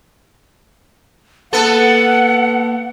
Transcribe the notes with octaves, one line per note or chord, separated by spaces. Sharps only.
A#3 B3 A4 F#5